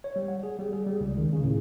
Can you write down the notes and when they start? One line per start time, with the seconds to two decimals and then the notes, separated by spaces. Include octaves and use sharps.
0.04 C#5
0.16 G3
0.28 F#5
0.43 G#4
0.59 G3
0.73 G#4
0.87 G3
1.01 C#2
1.17 D#3
1.33 C#3
1.44 A2